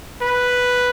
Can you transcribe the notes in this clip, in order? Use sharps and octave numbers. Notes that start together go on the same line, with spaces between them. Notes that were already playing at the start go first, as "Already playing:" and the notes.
B4